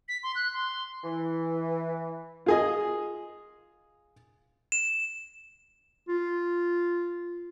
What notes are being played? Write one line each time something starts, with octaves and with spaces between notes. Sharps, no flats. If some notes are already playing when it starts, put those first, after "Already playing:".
B6
C6
F#6
C6
E3
F4 G#4 D#5
E7
F4